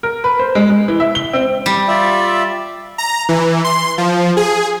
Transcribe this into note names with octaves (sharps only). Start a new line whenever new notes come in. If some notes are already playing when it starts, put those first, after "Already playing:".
A#4
B4
C5
G#3
G#3
E3
E5
G7
C4
G3
F4 D5 E5
A#5
E3
C6
F3
G#4